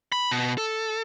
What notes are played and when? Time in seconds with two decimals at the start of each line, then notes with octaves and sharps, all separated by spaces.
0.12 B5
0.31 B2
0.58 A4